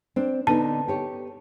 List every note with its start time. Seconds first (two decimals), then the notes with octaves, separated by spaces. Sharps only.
0.16 C4 D4
0.47 D3 B3 D#4 A5
0.88 G4 C#5